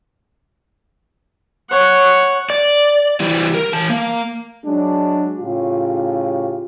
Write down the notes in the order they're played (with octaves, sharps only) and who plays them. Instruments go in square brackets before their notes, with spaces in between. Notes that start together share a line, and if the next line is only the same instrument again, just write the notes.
[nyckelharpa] C#5 F#5
[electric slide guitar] D5
[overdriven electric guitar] E3 G3
A#4
E3 A5
A#3
[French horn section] F#3 G#3 D4
A2 C#3 F4 G4